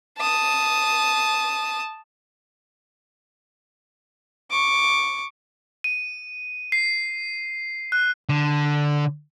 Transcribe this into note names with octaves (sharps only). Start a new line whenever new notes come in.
A5 D#6
C#6 D6
D#7
C7
F#6
D3